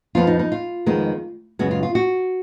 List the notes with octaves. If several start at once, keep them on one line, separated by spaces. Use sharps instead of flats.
F2 F3 B3 F4
D#4
D#4
F4
F2 D#3 G#3 B3
F#2 C#3 G#3 B3 F#4
F4
F4
F#4